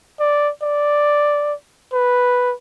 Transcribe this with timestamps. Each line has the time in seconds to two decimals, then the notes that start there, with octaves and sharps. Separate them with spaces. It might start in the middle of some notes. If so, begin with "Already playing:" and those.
0.20 D5
0.63 D5
1.93 B4